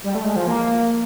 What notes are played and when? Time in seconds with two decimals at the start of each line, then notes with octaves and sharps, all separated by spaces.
0.04 G3
0.15 A3
0.25 G#3
0.36 F3
0.47 A#3